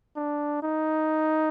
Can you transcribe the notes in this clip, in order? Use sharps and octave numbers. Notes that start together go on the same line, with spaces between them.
D4
D#4